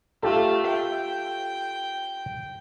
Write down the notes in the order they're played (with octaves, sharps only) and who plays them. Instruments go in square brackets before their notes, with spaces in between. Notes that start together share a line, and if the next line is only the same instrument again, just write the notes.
[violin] A3 [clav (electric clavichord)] F4 G4 A4
[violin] G5